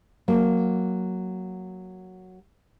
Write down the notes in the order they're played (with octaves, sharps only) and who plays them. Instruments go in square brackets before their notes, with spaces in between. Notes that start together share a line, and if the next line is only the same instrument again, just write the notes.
[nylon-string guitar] F#3 A#3